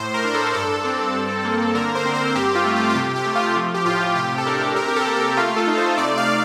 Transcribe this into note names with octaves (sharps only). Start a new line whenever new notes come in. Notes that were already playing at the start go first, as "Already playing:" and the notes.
Already playing: A2 C5
A#4
D4 A#4
A4
G2 A4
C4
G2
A#3
D3 A#4
C5
C4
C5
G2 G4
F4
A3
F4
F4
C3 G4
G4
A3
F4
F3
G4
A2 F4
C3 G4
A4
D4 A#4
C3 A#4
G4
A4
A#3
G4
A3 F4
A4
D#4
C5
C3 D5
F5